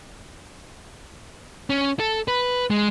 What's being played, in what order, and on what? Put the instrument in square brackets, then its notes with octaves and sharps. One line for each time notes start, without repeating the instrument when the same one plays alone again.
[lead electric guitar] C#4
A4
B4
G#3